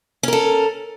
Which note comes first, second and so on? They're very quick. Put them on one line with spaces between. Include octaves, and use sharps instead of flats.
C#4 A#4 A4